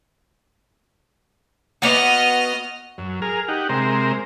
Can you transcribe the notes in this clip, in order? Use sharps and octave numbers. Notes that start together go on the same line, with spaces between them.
B3 F#4 D#5 F6
F#2
G#4 A#4 F6
D#4 G4 F#5
C3 G#3 A#4 C5